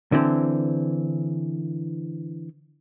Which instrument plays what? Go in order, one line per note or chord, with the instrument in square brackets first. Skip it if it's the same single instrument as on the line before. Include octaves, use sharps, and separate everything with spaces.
[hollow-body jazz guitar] D3 E3 C4